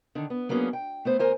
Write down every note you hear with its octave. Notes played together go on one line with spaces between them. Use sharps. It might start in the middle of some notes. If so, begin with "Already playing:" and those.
D3 D#3
B3
F#3 A#3 B3 C#4 D4 G#4
G5
A3 B3 C5
D2 A#4 C5 G#5